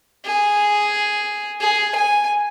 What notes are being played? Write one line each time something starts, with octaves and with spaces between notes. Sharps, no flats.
G#4
G#4
G#5